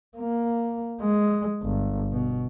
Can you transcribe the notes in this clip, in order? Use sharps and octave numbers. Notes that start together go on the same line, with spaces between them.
A#3
G#3
G1
B2